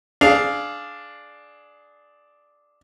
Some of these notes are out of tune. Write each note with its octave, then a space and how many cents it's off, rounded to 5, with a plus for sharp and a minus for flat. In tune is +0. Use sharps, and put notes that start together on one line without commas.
D4 +0 G#4 +20 F5 +0